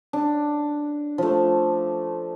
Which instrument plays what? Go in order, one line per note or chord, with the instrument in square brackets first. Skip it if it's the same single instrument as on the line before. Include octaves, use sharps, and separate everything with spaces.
[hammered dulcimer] D4
F3 A3